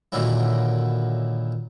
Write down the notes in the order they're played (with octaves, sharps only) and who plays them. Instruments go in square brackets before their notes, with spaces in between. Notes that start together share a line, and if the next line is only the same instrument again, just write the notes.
[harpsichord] A#2 D3 D#3 F#3 E4